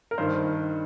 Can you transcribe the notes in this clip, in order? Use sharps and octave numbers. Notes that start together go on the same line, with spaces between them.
A#4
G2 D#3 C5